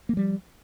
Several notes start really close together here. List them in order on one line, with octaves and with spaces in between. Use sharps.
A#3 F3 G3